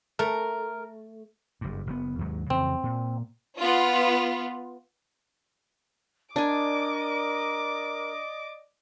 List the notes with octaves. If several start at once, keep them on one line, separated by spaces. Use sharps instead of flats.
A3 A#4
F#1 G2
F#1 A#2 B3
D#2 G#2 F#3
F2 C#3 E3 C4
A#2
B3 F4
D4 A#4 D5 D#5 G#5 D6